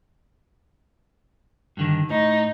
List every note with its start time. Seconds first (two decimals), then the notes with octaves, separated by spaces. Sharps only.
1.77 G2 D3 D#3
2.10 A2 D#4